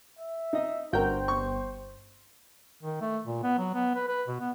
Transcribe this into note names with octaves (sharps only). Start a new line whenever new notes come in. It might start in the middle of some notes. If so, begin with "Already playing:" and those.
E5
D#4 D#5
G1 F#4 A#4 C5 G5
C#6
D#3
A3
A#2
B3
F#3
B3
B4
B4
B2
B3